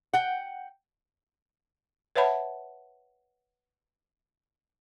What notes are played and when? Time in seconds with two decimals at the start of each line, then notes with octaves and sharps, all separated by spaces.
0.13 F#5 G5
2.16 B4 C#5 E5 F#5 A5 B5